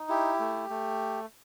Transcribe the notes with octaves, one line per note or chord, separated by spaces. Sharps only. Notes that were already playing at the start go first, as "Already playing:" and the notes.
Already playing: D#4
E4 G4
A3
A3